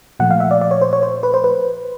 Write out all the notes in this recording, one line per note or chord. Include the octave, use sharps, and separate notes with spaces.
A#2 F3 A3 F#5
F5
E5
D5
D5
C#5
C5
C#5
C5
B4
C5
B4